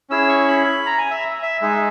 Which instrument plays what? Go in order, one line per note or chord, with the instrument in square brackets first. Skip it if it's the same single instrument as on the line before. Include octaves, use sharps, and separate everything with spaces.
[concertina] C#4 E4 G#4 E6
C#6
B5
A#5
G#5
E5
E5
G#3 D#4 G#4 E5